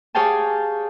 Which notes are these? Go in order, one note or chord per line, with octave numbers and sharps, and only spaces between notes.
G4 G#4 C#5 F5 G5 A5